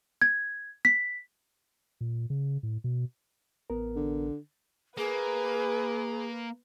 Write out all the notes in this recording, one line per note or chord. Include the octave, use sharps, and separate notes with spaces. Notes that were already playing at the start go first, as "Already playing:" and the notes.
G#6
B6
A#2
C#3
A2
B2
A1 B3 A#4
D3
A#3 G#4 B4